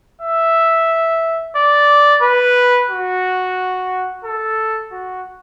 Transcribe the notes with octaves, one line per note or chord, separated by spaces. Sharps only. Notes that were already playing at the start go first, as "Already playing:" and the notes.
E5
D5
B4
F#4
A4
F#4